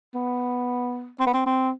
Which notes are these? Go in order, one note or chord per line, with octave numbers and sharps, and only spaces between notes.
B3
C4
B3
C4
C4